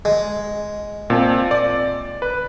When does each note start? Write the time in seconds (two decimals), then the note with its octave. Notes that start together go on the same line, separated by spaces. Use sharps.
0.05 G#3
1.10 A#2 C4 A5
1.51 D5
2.22 B4